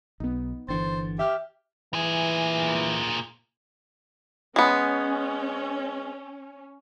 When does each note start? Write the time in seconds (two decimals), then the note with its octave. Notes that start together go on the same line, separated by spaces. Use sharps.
0.20 B1 B3 D#4
0.68 G1 D3 E3 C5 A6
1.19 G4 E5 F6
1.94 A#2 E3 G#4
4.56 G#3 B3 C#4